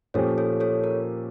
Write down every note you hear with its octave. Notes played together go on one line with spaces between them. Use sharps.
A#2 F3 C#4 G4 A4 C#5
A4 C#5
A4 C#5
A#4